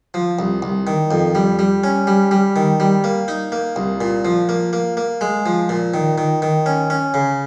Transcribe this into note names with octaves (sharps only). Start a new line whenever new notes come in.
F3
C2
C2
D#3
F2
G3
G3
C#4
G3
G3
D#3
G3
A#3
D#4
A#3
C2
A#2
F3
A#3
A#3
A#3
G#3
F3
A#2
D#3
D#3
D#3
C#4
C#4
C#3